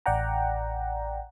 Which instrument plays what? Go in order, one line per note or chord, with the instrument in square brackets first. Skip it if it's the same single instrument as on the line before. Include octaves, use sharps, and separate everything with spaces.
[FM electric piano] A1 D5 F#5 G5 A#5